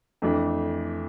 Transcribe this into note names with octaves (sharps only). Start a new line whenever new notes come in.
F2 E3 A3 D4